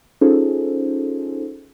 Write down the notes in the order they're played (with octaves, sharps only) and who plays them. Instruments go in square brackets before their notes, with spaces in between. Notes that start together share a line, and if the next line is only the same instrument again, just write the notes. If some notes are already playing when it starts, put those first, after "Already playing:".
[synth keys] C#4 D#4 F4 G#4 A4 C5